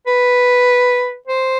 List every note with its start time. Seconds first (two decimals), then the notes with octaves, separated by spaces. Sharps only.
0.07 B4
1.27 C5